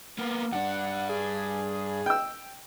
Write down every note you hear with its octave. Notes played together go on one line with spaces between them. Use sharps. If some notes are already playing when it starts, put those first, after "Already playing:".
A#3 B3
G2 D4 F#5
G#4
G5 E6